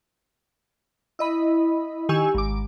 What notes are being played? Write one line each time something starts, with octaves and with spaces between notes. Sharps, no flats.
E4 D#5 B5
D#3 G4 G#5 C#6 E6
G#1 D6